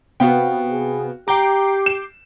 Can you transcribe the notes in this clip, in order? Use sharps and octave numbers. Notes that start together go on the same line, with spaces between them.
C3 B3 F#4 F5 G5
G#4
G4 G5 A#5 D6 G6 C7
E7